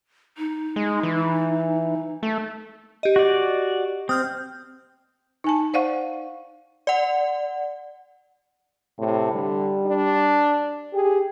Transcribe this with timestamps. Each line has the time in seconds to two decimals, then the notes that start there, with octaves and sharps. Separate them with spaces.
0.38 D#4
0.76 G#3
1.03 E3
2.23 A3
3.03 G4 D#5
3.16 F#4 D5
4.09 C4 D#6 F6 G6
5.44 D#4 G#5 A5
5.74 C5 D5 F5 F#5 C#6
6.87 D5 F#5
8.99 A2 C3
9.33 D3 G3
9.86 D4
10.94 G4 G#4